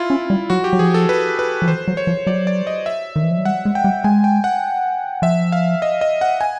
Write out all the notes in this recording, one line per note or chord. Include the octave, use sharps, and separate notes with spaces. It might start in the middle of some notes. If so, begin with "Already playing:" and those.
Already playing: E4 F4
C#4
G3
F#3 F#4
G4
F#3
F3 G#4
A4
B4
B4
F3
E3 C5
F#3
C#5
F3
F#3 D5
D5
D#5
E5
D#3
E3
F3
F#3
G3 F#5
G#3
G5
G3
G#3 G#5
G5
F#5
F3 E5
F5
D#5
D#5
F#5
G#5